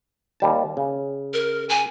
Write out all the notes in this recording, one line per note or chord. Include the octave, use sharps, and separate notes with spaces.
D#2 G3 A5
C#3
A#4
G#5